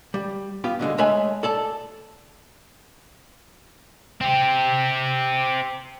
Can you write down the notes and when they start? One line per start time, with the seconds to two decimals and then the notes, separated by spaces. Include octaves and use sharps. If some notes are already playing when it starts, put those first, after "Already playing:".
0.14 G3
0.64 B3 F4 G4
0.79 B2 D3 E3 G#3
0.98 G#3 A3 C#5 E5 G#5 B5
1.43 A4 D5 A5
4.21 C4 G4 G5